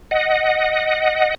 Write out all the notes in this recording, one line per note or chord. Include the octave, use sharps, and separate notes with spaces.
D#5 F#5